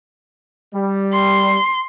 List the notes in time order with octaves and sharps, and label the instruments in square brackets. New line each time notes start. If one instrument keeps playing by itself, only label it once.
[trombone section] G3
[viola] C6